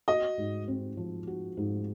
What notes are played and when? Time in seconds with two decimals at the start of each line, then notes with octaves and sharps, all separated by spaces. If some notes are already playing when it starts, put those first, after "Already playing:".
0.08 F#4 D#5
0.38 G#2
0.68 C4
0.97 F3
1.27 F#4
1.57 G#2